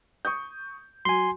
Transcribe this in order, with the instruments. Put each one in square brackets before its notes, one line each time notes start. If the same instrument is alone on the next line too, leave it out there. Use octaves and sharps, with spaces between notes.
[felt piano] C#6 D#6 G6
[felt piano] F#3 [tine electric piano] G#5 C6